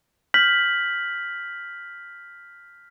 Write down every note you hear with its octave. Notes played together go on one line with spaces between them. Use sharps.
F6 G6 B6 F#7